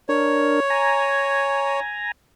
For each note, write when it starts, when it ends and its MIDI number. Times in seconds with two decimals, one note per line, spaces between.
0.09 0.60 62
0.09 0.60 70
0.09 1.80 73
0.70 2.12 80
0.70 2.12 82